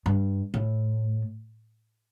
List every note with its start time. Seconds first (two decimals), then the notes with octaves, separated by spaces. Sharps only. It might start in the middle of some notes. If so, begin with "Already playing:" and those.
0.06 G2
0.54 A2